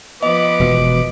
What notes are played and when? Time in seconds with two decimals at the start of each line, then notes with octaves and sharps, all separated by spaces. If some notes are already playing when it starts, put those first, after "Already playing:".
0.23 F3 B3 B4 D#5 D6
0.60 E1 B2